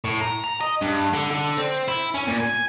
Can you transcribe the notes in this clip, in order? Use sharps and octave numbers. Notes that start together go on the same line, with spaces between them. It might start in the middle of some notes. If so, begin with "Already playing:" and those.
A2
A#5
A#5
D#5
G2
D3
D3
C4
E4
C#4
A#2
G#5